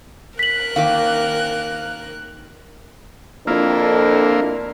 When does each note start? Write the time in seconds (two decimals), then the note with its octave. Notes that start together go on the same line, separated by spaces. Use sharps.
0.39 A#4 F#6 B6 F#7
0.76 D#3 A#3 F5 D6
3.47 F2 A#3 D4 E4 F4 A#4